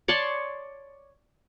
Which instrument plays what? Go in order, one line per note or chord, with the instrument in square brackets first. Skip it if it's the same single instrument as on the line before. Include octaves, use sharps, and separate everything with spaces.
[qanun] C#5 D5 A5 C6